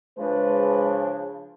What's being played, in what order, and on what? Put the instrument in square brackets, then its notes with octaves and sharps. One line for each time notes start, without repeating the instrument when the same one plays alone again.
[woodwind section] C#3 F3 D4 [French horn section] G#3 G#4 B4